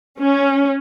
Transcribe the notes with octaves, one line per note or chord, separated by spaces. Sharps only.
C#4